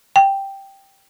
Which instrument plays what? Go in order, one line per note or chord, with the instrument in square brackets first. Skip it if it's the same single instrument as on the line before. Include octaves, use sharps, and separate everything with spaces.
[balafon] G5